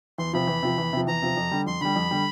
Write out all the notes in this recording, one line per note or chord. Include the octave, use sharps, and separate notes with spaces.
E2 C6
C3 F3 B5
E2
C3 F3
E2
C3 F3
E2 A#5
C3 F3
F2
D3 G3
F2 C6
D3 G3 B5
F2
D3 G3